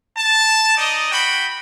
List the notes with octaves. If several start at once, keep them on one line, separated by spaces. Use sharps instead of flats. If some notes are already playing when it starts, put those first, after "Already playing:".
A5
D#4 D5 D#5
F#4 G5 B5